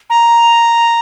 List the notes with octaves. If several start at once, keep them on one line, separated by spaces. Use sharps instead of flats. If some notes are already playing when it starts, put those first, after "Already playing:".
A#5